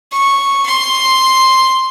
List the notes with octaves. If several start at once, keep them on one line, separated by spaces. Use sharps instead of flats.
C#6
C6